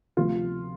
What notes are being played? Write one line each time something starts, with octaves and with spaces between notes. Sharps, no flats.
D2 C3 F3 F4